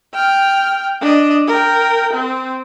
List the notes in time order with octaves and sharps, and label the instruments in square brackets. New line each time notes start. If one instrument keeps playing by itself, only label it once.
[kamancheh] G5 F6
D4 D#5
A#4 G5
C4